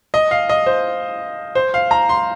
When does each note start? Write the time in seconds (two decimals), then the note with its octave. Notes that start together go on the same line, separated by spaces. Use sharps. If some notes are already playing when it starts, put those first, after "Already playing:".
0.14 D#5
0.31 F5
0.49 D#5
0.66 C5
1.55 C5
1.74 F5
1.91 A#5
2.09 C6